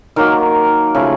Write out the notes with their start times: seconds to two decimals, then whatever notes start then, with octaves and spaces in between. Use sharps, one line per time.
0.16 D#3 F#3 A#3 A#4
0.95 C#3 F3 A3